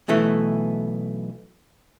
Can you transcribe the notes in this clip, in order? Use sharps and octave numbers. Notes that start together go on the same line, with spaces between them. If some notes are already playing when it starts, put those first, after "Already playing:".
B1 B2 E3 A3 E5